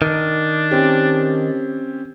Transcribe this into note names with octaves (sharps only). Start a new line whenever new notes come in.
D#3 D4
C4 C#4 G4